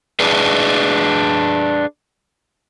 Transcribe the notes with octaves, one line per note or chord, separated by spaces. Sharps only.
D4 G#4 B4